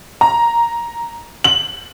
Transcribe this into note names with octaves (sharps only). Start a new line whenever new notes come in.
A#5
F#7